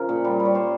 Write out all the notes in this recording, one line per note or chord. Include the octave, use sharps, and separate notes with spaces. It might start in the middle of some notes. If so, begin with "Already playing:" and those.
Already playing: C#3 F3 A#4
A#2
G3
G3
C#5
G3 C5